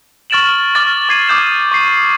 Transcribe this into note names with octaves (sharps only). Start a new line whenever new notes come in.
C#6 F6 A6 D7 E7 F#7
C#6 D6 F6 A6
D6 G#6 C7 D#7
D6 D#6 G6 E7
C#6 C7